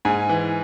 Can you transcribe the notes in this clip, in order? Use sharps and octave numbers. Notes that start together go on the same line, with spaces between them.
G#2 G#5
E3